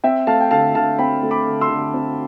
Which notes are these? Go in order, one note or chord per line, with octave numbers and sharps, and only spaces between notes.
C4 E5 G5
A3 F5 A5
G5
D3 F5 A5
D3 F5 A5
C4 G5 B5
A3
B5 D6
D3
C6 E6
D3
C4